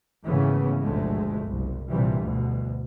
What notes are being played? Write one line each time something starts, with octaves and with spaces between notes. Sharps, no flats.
G#1 C#3 E3 A3 B3 C#4
G1 D2 B2 F3 G#3 A3
F#1 C2
A#1 G2 C3 E3 F3 G3
D2 B2